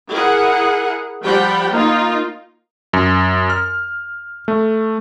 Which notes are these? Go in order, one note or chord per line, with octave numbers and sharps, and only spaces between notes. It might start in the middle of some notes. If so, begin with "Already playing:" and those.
E4 G#4 A#4 F#5
F3 G3 G4 F#5 G5 B5
A#3 D#4 F4
F#2
F6
A3